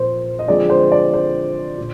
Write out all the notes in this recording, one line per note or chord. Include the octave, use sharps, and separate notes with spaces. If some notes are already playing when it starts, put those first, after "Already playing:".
Already playing: A#2 F3 C4 A#4 C5
D#5
D3 F3 G#3 C4 D5
C5
D5
C5
A#2